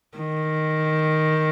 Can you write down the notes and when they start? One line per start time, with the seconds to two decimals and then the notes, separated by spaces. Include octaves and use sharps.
0.18 D#3